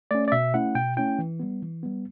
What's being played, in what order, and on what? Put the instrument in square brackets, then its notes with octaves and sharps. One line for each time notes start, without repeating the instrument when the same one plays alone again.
[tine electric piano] A3 C#4 D5
D5
B2 E5
A3 C#4 E4 F#5
B2 G5
A3 C#4 E4 G5
E3
G3 B3
E3
G3 B3